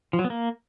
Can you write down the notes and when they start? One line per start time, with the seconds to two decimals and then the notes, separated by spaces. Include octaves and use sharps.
0.13 F3
0.19 F#3
0.25 B3
0.30 A#3